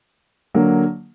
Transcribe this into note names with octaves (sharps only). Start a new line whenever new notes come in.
D3 F#3 A#3